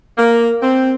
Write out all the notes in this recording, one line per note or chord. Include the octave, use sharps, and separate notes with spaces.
A#3
C4